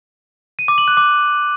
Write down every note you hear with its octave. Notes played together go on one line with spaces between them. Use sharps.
D#7
D6
F#7
F#6
D6